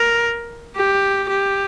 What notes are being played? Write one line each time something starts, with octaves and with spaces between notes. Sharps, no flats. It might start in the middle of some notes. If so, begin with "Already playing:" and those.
Already playing: A#4
G4
G4